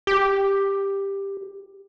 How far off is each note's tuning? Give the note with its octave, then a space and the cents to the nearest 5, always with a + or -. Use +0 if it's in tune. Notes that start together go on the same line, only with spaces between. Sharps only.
G4 +10